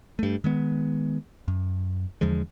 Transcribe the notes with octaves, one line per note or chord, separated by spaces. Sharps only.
G2 A3
D#3 G#3 B3
F#2
E2 D3 F3 G#3